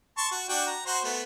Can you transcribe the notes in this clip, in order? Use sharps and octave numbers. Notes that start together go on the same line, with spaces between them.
A5 C6 C#6
F#4
D4 F#4 G5
A#5
F#4 C5 C6
A3 B3